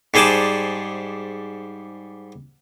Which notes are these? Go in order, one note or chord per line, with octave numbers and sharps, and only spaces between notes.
G#2 G3 G#4 C5 D5 A5